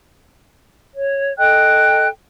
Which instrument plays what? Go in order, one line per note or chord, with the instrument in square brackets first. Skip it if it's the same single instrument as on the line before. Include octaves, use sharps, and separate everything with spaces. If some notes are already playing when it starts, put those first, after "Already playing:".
[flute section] C#5
A4 D#5 G5 F#6